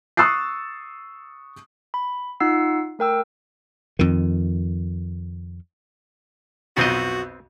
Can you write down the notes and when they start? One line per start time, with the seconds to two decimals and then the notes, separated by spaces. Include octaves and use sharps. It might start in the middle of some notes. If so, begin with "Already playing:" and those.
0.17 C#6 D#6 E6 F#6 A6 C7
1.94 B5
2.40 D#4 F4 F#5 E6 C7
2.99 A3 A#4 G5 E6
3.99 F2 D#3
6.77 B1 F2 B2 B3 C4 F#4 D#5